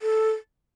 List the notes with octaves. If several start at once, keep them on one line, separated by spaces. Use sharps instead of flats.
A4